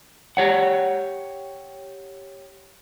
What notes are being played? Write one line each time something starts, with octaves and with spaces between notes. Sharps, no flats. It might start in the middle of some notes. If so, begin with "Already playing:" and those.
G4 C#5 F#5